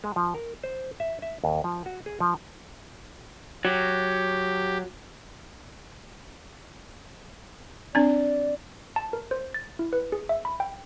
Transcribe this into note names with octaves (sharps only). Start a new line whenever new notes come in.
G#3
F3
A#4
C5
E5
E5
D#2
F3
F#4
G#4
F3
F#3 G4
C4 D4 D5
A5
A#4
C5
A6
E4
B4
G#4
E5
B5
G5